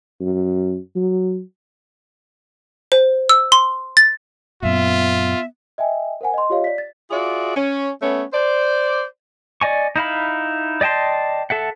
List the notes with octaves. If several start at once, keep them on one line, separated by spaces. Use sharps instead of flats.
F#2
F#3
C5
E6
C6
A6
F#2 A#2 B3 F4 E5
D#5 E5 G5 G#5
A#4 C5 F#5 G#5
D#5 C6
F4 G4 C#5 D#5 F5
D5 B6
A6
F4 F#4 G#4 D5 E5
C#4
A3 B3 C#4
C5 D5
D5 D#5 G#5 C#6
D#4 E4 F5 B5
D5 D#5 G5 A5 C6
A4 E5 F#5